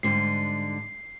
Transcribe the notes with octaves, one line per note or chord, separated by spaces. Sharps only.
G#2 D3 G3 C7